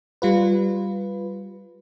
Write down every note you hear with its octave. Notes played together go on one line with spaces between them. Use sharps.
G3 F4 B4